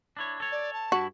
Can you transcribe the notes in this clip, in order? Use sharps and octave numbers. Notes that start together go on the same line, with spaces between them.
D4 E4 C#5
A4 C#5
D5
A5
G2 E4 F#4